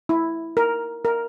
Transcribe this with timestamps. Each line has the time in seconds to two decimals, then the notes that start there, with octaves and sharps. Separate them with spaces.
0.09 E4
0.57 A#4
1.05 A#4